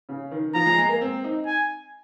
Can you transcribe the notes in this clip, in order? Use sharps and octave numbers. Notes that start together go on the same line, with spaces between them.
C#3
D#3
F3 A#5
G#3
G#3
A#3
C4
D#4
G#5